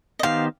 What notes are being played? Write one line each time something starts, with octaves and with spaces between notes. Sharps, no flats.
D#5
D#3 B3 D#4 G4 C5 F5